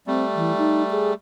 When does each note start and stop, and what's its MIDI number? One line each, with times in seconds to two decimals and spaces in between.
0.07 1.14 55
0.07 1.14 57
0.07 0.24 60
0.35 0.56 52
0.58 0.83 63
0.91 1.11 68